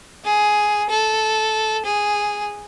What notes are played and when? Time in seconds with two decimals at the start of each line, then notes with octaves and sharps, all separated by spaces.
0.25 G#4
0.90 A4
1.85 G#4